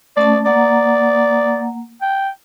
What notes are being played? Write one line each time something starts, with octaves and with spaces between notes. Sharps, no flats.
A3 C#4 D5 A5
A#3 D5 F#5 A#5
G5